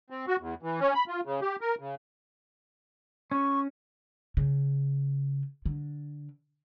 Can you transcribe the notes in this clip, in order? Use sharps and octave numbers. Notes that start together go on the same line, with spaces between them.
C4
F#4
E2
E3
C#4
B5
F4
C#3
G4
A#4
C#3
C#4 C#6
C#3
D3